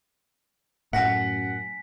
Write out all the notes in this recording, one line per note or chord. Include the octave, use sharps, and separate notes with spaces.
F#2 A2 F#5 G#5 A#6 B6